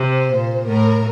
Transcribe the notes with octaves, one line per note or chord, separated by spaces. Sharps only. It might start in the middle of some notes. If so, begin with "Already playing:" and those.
Already playing: C3 C5
A#2
A2 A#4